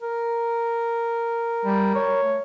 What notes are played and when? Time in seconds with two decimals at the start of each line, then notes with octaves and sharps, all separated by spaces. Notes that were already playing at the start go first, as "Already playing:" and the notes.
0.01 A#4
1.65 G3
1.95 C#5
2.23 A3